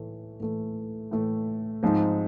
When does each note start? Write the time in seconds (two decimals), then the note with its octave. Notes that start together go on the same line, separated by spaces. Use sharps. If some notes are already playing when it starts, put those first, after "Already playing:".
Already playing: A2 E3 A3
0.40 A2 E3 A3
1.11 A2 E3 A3
1.83 G#2 F3 G#3 C4 D#4